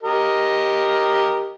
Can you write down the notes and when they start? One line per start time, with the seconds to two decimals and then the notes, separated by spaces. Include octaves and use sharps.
0.03 G4 A#4 D#5